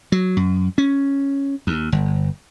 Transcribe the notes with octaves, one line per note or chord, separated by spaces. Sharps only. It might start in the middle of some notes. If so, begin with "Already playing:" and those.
F#3
F#2
C#4
D#2
G1